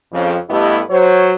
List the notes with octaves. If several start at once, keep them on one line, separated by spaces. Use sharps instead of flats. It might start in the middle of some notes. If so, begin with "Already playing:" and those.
F2 C#3 F3
G2 A3 B3 E4 G4 D#5
F#3 C5 C#5